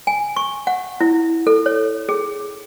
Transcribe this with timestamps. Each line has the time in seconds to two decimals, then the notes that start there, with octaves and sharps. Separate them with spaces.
0.07 G#5
0.36 C#6
0.67 F#5
1.01 E4
1.47 A4
1.66 C#5
2.09 G#4